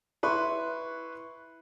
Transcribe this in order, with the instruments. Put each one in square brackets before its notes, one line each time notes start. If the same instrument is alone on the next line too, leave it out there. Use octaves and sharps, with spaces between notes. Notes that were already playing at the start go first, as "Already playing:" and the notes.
[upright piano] E4 B4 C6 C#6